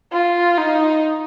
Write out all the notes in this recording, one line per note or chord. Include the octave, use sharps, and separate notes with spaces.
F4
D#4